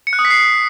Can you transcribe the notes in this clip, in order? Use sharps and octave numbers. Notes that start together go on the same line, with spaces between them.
C#7
F#6
D#6
B6
C7